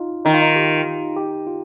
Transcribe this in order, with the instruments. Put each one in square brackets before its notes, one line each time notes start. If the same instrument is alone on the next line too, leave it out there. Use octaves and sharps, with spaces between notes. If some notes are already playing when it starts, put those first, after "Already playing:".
Already playing: [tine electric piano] D#4 F4
[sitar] D#3 [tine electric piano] D#4
[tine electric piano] F4
D#4
G4
G4
F4